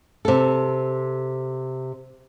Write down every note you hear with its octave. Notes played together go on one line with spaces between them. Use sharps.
C3 A4